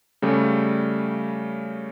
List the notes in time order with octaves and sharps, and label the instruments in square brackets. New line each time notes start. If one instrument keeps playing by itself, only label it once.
[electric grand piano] C#3 G3 A3